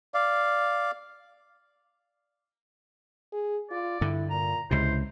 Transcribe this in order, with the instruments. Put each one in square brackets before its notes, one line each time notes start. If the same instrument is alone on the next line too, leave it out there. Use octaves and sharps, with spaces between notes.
[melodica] D5 F5
[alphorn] G#4
[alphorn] F4 [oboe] D5
[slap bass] G2 D3 [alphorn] E4
[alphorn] A#2 [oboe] A#5
[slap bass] C#2 C3 [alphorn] E4 [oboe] C5